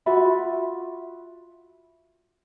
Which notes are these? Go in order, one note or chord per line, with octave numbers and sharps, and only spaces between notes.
F4 F#4 E5 B5